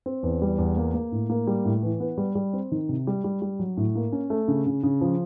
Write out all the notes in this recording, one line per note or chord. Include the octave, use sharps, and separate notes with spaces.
C4
E2
G3
E2
A#3
A#3
A2
A#3
G3
A2
E3
B3
G3
G3
C4
D#3
C3
G3
G3
G3
F#3
A2
A#3
C#4
A3
C#3
C#3
C#3
F3